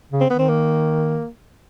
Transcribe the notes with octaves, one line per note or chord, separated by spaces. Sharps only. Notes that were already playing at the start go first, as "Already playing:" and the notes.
C#3
C4
D#3 B3
C4
A#3